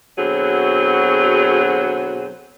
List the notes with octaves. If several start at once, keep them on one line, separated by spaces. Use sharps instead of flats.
B2 D3 F#3 C4 F#4 G#4